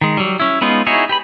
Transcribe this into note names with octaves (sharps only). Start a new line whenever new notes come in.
D#3 G#3
F#3 G3
C#4 E4
G#3 B3 C#4 D#4 F4
D#4 E4 F#4 G#4 C#5
G4 B4 B5